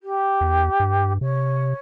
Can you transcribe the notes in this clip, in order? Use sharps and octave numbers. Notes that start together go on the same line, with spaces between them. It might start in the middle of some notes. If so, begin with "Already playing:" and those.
G4
E2
G2
C3 C#5